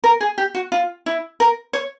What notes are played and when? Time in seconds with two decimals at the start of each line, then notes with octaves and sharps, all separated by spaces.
0.04 A#4
0.21 G#4
0.38 G4
0.55 F#4
0.72 F4
1.06 E4
1.40 A#4
1.73 C#5